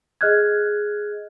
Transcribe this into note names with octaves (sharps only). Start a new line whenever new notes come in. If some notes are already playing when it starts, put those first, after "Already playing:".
G#4 D#5 F6 F#6 G#6